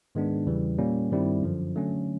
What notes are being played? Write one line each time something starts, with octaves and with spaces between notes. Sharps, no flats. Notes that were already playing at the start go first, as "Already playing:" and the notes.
G#2 D#3 G#3 B3 D4
E2 C#3 E3 G3
A#2 G3 A#3 C#4
G2 D#3 G3 C4 E4
F#2 D3 F3
D3 F#3 A3 C#4